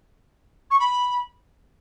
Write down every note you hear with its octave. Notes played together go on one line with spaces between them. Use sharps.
C#6
B5